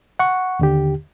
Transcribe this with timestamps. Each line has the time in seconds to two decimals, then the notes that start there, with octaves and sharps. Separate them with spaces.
0.19 F#5 C#6
0.59 D#2 D3 G4